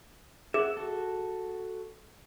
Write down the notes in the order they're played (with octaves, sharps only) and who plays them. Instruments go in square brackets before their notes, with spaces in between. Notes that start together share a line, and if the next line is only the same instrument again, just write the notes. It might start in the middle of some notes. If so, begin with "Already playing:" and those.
[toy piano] G#4 [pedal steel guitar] E5 F#5
[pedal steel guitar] F#4 A4